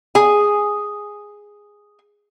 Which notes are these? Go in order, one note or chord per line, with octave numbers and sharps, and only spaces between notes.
G#4 G#5